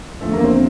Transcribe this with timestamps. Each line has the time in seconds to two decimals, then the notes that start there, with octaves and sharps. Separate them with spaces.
0.21 E2 D3 F3 A3
0.33 A#3
0.44 C4